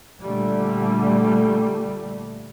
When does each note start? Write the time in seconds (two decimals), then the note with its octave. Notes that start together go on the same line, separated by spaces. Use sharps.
0.22 A#2 D3 G3 A3